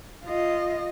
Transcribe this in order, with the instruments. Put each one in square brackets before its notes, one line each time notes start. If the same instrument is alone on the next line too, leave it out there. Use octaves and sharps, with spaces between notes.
[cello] F4 D#5